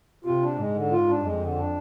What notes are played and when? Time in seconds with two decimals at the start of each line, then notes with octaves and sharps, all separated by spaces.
0.25 C3 F4
0.42 D4
0.57 G#2 G#3
0.75 D3
0.91 F4
1.08 D4
1.23 F2 G#3
1.41 D3
1.57 D4